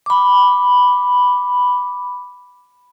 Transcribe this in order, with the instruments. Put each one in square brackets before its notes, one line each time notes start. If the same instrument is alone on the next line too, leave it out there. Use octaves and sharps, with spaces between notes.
[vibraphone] B5 D6